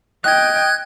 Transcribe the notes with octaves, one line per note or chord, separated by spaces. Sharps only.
D#5 G5 F#6 G#6